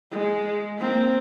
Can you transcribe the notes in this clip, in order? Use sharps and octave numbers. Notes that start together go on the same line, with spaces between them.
G#3
A#3 C4